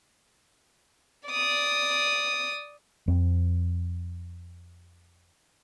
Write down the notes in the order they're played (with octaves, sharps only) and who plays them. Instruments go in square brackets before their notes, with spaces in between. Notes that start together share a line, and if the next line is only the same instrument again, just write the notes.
[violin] D5 D#6
[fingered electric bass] F2 C4